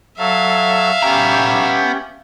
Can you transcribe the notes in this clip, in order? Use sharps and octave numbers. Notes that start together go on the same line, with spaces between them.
F#3 A4 E5 F5
B3 C#4 G4 G5 A#5